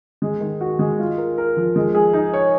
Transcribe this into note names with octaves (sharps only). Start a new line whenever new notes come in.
G#3
D#3
F#4
G#3
F4
A#4
A#4
F3
G#3
G#4
D#4
C#5